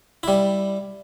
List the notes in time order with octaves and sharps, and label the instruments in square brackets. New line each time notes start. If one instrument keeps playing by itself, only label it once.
[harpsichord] G3 E4